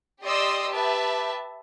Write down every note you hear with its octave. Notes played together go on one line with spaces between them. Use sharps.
G4 D5 D#5 C6 D#6 E6
G4 B4 E5 A5